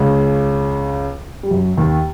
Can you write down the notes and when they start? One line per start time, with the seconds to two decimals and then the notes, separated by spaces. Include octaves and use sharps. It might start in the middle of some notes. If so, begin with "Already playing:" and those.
Already playing: C#2 C#3
1.43 G3
1.51 F#2 F#3
1.77 D#2 D#3